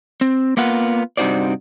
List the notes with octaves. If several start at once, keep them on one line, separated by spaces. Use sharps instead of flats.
C4
A#3 B3 F4 F#5
G2 C3 D#4 F#4 C5 D5